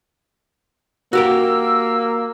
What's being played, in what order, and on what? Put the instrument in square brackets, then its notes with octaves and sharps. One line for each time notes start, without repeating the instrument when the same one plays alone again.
[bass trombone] A#3 [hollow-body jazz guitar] F#4 G4 A#4 [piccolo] E6